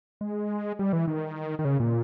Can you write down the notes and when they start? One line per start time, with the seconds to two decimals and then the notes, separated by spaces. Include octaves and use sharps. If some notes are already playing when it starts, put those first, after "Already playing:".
0.21 G#3
0.79 G3
0.93 E3
1.07 D#3
1.59 D#3
1.65 C#3
1.80 A#2